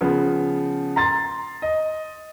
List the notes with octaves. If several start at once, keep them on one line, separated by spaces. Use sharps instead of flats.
C#3 F3 B3
A#5 C6 A6
D#5